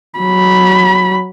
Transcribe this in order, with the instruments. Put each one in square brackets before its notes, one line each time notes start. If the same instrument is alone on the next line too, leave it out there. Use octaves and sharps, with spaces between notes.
[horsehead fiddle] F#3 B5